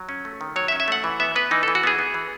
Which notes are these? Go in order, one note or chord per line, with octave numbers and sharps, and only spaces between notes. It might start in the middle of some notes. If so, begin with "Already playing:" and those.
Already playing: F#3
C#4
A3
D#3
F#3 C#5
E5
C#4
E5
A3 F#5
E3
B3 E5
B3 B4
E3 D#4
E3 A4
F#4
B3 G#4
B3
E3